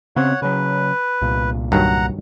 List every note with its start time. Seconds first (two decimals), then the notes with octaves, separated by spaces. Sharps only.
0.16 C#3 B3 C4 C#5 F#5
0.42 C#3 F#3 B4
1.22 C2 A#2
1.72 G2 D#3 F#3 F#5 A#5